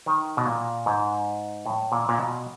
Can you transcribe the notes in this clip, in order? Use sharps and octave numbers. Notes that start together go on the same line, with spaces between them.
D#3
B2
A#2
G#2
A2
A#2
A#2
B2